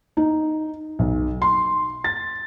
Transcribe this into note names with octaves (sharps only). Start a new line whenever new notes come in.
D#4
B1
C6
A6